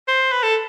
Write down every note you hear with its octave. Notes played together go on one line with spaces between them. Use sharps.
C5
B4
A4